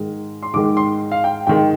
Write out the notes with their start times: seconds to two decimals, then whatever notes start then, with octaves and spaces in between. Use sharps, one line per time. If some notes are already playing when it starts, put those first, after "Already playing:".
Already playing: G#2 D#3 G#3
0.43 C6
0.53 G#2 D#3 G#3 D6
0.77 C6
1.12 F5
1.24 G5
1.47 G#2 D#3 G#3 G5